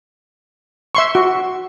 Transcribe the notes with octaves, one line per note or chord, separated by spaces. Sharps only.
E5 C6 C#6
F#4